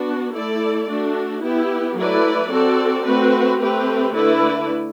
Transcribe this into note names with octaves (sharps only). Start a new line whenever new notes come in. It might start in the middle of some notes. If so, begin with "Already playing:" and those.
Already playing: B3 D4 F#4
A3 E4 A4 D5
A3 D4 F#4
B3 E4 G4
F#3 A3 E4 B4 D5
C4 F#4 A4 D5
A3 C4 F#4 B4
A3 C4 G4 B4
D3 A3 E4 B4 D5